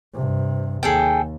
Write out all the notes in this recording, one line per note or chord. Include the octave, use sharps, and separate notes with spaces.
G2 C3
D#2 G#4 A4 G5